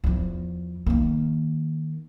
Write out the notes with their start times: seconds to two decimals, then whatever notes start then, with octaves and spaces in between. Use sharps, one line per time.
0.04 E2 F3
0.86 D#3 A#3